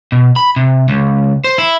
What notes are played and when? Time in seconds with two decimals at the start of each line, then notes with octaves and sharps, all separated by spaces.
0.12 B2
0.36 B5
0.56 C3
0.89 C#2
1.44 C5
1.58 E4